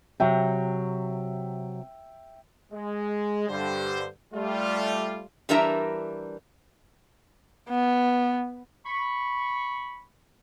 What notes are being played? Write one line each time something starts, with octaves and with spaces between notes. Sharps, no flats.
C3 F#3 E5 G5
G#3
G2 D3 G3 C5
G3 A3 F4
E3 G3 D4 A#4 E5 A#5
B3
B5 C#6